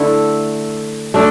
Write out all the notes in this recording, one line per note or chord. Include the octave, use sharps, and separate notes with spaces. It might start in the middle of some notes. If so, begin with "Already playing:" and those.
Already playing: D3 A3 E4 A4
A3 D4